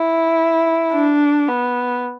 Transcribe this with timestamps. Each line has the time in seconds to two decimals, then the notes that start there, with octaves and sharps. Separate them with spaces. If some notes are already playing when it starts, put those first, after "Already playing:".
Already playing: E4
0.93 D4
1.49 B3